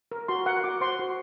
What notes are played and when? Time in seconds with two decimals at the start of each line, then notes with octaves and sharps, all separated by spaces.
0.12 A#4
0.28 F#4 C6
0.46 A#4 F#5
0.64 F#4 D6
0.81 C5 C6
0.99 F#4